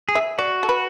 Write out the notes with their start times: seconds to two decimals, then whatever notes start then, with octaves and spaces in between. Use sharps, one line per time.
0.09 G#4
0.15 E5
0.38 F#4 D5
0.63 A4
0.69 B4